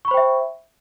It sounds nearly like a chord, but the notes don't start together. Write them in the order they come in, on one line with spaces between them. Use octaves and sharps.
C#6 B5 C5 G5 E5